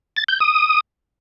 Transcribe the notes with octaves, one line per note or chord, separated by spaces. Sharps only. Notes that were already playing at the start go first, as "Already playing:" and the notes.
A6
G6
D#6